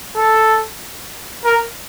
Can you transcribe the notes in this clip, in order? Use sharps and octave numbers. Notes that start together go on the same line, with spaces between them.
A4
A#4